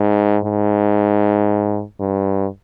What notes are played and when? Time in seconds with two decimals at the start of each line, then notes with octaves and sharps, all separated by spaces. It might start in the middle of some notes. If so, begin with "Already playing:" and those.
Already playing: G#2
0.44 G#2
2.00 G2